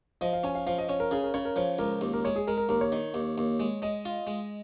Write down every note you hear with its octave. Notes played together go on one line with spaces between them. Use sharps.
F3 D#5
F5
C#4 G#5
F5
F3 F5
D#5
C#4 C#5
A#4
C#3 G#4
A#4
C#3 C#5
A#4
F3 C#5
C#2 A#4
D#2
A#4
G#3 C#5
G#4
G#3 A#4
A#4
D#2 A#4
C#5
D#3
D#2
D#2
G#3
G#3 D#5
F4
G#3